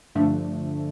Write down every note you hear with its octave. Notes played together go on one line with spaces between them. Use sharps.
G2 D3 F3 A3 D4